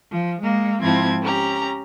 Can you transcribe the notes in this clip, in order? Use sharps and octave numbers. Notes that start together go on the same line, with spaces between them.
F3
G#3 A#3
G#2 F3 C4 E4 A5 G#6
C#4 G4 A#5